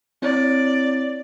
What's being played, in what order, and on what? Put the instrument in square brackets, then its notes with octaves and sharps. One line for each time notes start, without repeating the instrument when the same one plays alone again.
[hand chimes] C4 E4 C#5 [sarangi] D5